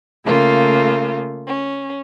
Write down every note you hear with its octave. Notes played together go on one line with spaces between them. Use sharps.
C#3 A3 A#3 F4
C#4